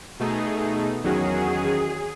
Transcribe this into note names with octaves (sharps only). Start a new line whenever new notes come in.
B2 A3 D#4 G#4
E2 D#3 F#3 C#4 F#4 G#4